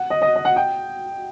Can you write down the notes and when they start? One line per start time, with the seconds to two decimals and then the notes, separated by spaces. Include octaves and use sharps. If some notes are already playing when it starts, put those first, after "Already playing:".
Already playing: F#5
0.10 D#5
0.22 D#5
0.36 D#5
0.45 F#5
0.56 G5